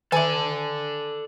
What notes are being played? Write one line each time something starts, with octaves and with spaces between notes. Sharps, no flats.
D#3 A4 D5 E5 G#5 A5